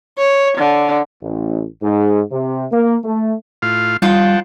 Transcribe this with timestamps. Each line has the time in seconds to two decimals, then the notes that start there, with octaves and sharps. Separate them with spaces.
0.18 C#5
0.58 D3
1.21 A1
1.82 G#2
2.32 C3
2.72 A#3
3.04 A3
3.62 A2 F4 F5
4.02 F2 G3 F4 F#5 G5 A5